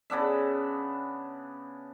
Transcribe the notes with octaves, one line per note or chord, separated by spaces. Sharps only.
C#3 B3 D4 E5